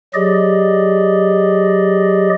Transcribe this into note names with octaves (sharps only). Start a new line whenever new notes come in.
F#3 G4 G#4 D5 D#5